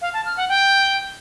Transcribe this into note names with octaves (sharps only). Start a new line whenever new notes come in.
F5
A5
F6
F#5
G5